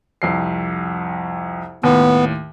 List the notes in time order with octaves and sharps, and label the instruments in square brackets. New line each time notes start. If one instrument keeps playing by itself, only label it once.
[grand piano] C2 F2 C7
[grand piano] D#2 A2 [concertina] B3